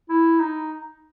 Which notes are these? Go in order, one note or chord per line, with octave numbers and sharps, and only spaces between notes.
E4
D#4